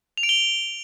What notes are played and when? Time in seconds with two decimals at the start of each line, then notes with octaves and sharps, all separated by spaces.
0.18 F7
0.23 D7
0.29 G7